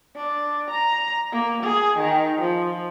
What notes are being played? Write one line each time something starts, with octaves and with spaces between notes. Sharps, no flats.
D4
A#5
A#3
G#4
D#3
F3